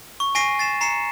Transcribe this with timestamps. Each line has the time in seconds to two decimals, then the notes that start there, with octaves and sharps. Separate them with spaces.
0.20 C#6
0.35 G#5 C#6 A#6 C7 D#7
0.59 A6 C7 E7
0.81 A#5 C7 C#7 E7